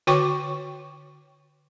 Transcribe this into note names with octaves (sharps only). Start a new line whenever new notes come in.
D3 F#4 C#5 G5 C#6 D6